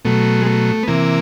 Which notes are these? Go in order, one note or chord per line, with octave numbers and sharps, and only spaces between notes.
B2 F#3 A3
G#3
A3
B3
C3 E3 A#3